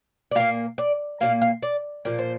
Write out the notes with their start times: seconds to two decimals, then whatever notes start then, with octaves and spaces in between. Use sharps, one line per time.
0.31 D5
0.35 A#2 A#3 F5
0.78 D5
1.21 A#2 F3 A#3 F5
1.42 F5
1.63 D5
2.05 A#2 F3 A#3 D5
2.19 C5